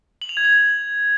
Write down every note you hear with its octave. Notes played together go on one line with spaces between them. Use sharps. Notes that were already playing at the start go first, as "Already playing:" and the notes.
F#7
F7
G#6
F#7